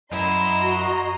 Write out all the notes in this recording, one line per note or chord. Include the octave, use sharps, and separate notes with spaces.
F#2 E4 D#5 A#5 C6
F#4